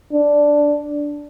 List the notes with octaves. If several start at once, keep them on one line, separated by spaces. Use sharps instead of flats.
D4